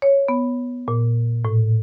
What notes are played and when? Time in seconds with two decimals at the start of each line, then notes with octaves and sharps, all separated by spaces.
0.02 C#5
0.29 B3
0.88 A#2
1.45 A2